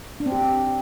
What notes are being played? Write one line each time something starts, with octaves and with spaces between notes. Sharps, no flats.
D4
C4
G4